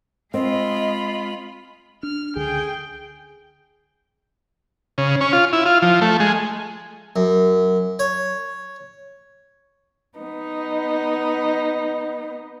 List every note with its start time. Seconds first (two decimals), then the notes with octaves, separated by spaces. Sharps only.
0.34 G#3 C4 F4 D#5 B5
2.03 D4 F6
2.36 C#2 D3 G#4 G5
4.98 C#3
5.21 C#4
5.33 F4
5.53 E4
5.66 F4
5.82 F3
6.01 A3
6.20 G#3
7.16 F#2
7.99 C#5
10.17 B3 D#4